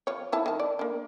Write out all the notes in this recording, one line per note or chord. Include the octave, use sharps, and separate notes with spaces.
F3 C#5
F3 E4 A5
D#3 A5
D5
A#3 D4